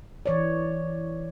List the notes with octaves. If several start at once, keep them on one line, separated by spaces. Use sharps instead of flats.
E3 C#5 D5